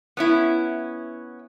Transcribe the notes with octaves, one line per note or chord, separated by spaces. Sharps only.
B3 C#4 E4